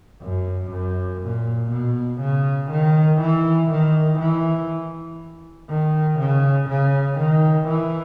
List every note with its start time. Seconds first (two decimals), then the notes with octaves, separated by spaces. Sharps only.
0.23 F#2
0.72 F#2
1.23 A#2
1.71 B2
2.21 C#3
2.71 D#3
3.21 E3
3.71 D#3
4.19 E3
5.70 D#3
6.19 C#3
6.69 C#3
7.19 D#3
7.68 E3